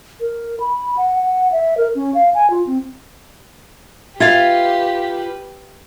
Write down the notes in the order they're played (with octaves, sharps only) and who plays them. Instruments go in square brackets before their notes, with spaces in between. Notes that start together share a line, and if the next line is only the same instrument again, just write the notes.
[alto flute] A#4
B5
F#5
F#5
E5
A#4
C#4
F5
G#5
F4
C4
[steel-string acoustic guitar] F4 F5 [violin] G4 B4 [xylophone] E5 G#6 A6